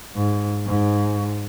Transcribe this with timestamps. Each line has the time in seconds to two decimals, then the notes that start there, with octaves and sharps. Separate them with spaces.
0.16 G#2
0.66 G#2